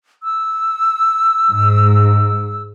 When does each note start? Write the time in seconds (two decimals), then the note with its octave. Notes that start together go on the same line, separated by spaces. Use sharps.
0.23 E6
1.50 G#2